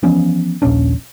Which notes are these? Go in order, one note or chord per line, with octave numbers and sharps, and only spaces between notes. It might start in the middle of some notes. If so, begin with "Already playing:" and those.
E3 F3 B3 C#4
D#1 A#1 C#4 D4